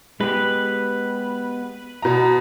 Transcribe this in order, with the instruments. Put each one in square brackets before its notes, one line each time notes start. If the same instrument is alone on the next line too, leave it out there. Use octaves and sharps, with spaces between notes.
[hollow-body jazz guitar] G#3 B3 G4 [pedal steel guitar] B4
[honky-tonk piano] B2 A#5